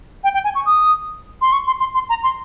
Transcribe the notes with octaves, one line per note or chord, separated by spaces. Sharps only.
G5
G5
G#5
C#6
D#6
C6
C#6
C6
C6
C6
A#5
C6